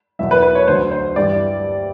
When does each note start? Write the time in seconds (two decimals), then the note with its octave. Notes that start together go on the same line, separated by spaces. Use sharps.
0.19 E2 B2 F#3 E5
0.31 B4
0.42 B4
0.55 C#5
0.68 D2 D3 F#3 C5
0.92 C5
1.16 G2 E3 G3 D5